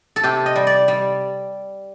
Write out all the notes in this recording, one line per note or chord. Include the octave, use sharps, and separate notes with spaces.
A4
C3 G4
D#5
G3
D5
G3